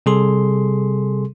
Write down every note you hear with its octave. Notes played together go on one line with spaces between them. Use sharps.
C3 G3 G#4 A4 C6